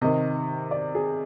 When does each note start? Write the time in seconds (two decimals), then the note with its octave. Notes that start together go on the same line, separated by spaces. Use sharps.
0.01 C3 D#3 D#5
0.71 D5
0.95 G#4